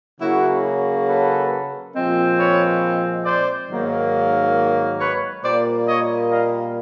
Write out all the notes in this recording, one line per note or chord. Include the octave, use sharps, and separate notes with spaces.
C#3 F#3 A#3 E4 F#4
A4 B4
A#2 F3 G#3 C4
B4 C#5
C5 D5
G#2 D#3 F#3 A#3
B4 C#5
A#2 G3 A#3 C5 D5
C#5 D#5
D#5 F5